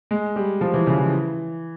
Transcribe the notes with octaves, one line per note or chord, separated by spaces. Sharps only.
G#3
G3
F3
E3
C#3
E3